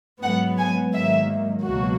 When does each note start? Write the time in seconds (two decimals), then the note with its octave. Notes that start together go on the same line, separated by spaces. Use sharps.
0.22 G#2 F#3 B3 F#5
0.58 G#5
0.93 G#2 D#3 F#3 A#3 E5
1.65 C#2 B2 F#3 A#3 F#4